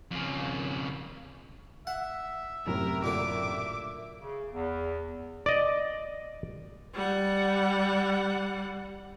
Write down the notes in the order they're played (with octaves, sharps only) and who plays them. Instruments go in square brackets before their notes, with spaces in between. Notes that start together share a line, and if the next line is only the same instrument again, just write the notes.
[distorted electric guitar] F2 C#3
[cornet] E5 [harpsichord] F#5
[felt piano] F#2 A2 C3 [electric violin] A#4
[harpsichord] A#2 D3 [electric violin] D6
[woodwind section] C#3
E2
[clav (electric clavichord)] D5 D#5
[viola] G3 F#5